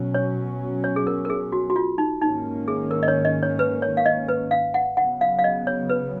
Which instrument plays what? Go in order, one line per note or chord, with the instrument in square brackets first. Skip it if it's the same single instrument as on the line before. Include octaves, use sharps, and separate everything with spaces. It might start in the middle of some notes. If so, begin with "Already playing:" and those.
Already playing: [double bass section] B2 F#3 C#4
[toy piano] C#5
C#5
G#4
A#4
A#4
G#4
F#4
F#4
F4
D#4
[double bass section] G#2 D#3 A#3 C#4 [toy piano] D#4
[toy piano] G#4
A#4
D#5
C#5
D#5
C#5
B4
C#5
F5
D#5
B4
F5
F#5
[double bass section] C#3 F#3 B3 [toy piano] F#5
[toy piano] F5
F5
D#5
C#5
B4